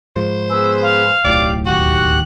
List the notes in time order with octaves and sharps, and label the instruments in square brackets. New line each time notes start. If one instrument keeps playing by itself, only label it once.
[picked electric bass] G#2 F3 [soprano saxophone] C5
[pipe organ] B3 G#4 B4 [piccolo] E6
[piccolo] F5
[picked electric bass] D1 B1 A2 [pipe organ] G4 [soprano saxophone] D5
[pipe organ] D#2 G4 F#6 [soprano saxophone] F#4 [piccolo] F#5